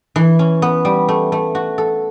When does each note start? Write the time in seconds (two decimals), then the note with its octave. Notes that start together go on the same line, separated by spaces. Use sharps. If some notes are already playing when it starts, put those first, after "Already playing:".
0.16 E3
0.39 C#4
0.62 B3
0.85 G3
1.08 A3
1.32 A3
1.55 F#4
1.78 A4